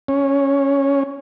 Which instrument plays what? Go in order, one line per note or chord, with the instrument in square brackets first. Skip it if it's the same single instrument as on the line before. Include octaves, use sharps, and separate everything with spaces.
[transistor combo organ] C#4